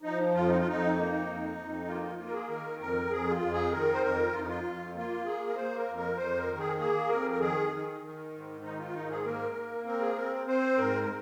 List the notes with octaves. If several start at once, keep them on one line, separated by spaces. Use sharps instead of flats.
F3 D#4
F2 F4
D#4
F4
F2 D#4
A#3
F2
F2
A#3 F4
D#4
F4
A#3 F4
A#4
G#4
D#3 A#4
F2 A#4
F2 G#4
F4
F2
G#4
D#3 A#4
C5
F2 A#4
F2 F4
D#4
F4
F2
A#3 F4
A#3 G#4
A#4
A#3 C5
A#4
F2
A#4
F2 C5
A#4
D#3
G#4
A#3 G#4
F2 A#4
A#4
D#3 G#4
D#3
D#3
G#2
D#3 D#4
F4
G#2 D#4
G#4
A#3 A#4
A#3
C4 A#4
G#4
C4 A#4
C4 C5
G#2 A#4
A#4